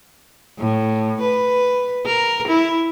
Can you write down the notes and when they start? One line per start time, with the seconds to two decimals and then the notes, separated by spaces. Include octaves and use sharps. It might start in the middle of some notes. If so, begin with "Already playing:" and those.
0.59 A2
1.21 B4
2.06 A#4
2.48 E4